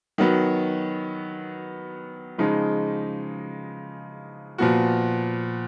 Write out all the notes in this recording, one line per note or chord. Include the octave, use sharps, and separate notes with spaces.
D#3 F#3 B3
C#3 F3 G#3 D#4
A#2 F3 B3 F#4